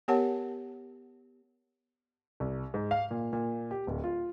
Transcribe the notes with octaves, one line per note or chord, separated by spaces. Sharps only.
B3 G4 A#4 C#5 F#5 A5
C2
G#2
F5
A#2
A#2
G4
D1
F4